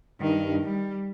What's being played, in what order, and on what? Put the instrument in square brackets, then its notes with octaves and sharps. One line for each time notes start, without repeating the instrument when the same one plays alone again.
[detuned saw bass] G2 [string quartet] D#3
[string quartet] G3